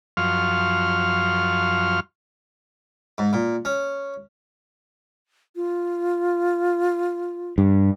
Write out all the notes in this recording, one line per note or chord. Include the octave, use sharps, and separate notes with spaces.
F#2 F3 F5 C6 C#6 F6
G#2
A#2
C#4
F4
G2